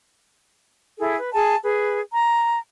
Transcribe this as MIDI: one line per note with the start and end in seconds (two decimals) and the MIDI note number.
0.98 1.16 64
0.98 1.16 68
0.98 1.16 69
1.16 1.33 71
1.34 1.55 68
1.34 1.55 80
1.34 1.55 81
1.63 2.00 68
1.63 2.00 71
2.13 2.58 82